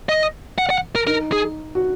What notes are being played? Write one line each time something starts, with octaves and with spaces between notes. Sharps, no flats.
D#5
F#5
F#5
A#4
D#4 A#4
G#4
F#4